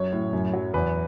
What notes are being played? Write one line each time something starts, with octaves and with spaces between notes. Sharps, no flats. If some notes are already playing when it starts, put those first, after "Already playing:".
Already playing: F#2 F#3 C#5
A2
F#2
F#3
E2 B4